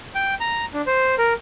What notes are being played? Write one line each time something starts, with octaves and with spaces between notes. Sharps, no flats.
G5
A#5
D4
C5
A#4